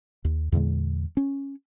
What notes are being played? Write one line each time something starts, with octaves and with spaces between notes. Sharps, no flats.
D#2
E2 A#2 D3 G#3
C#4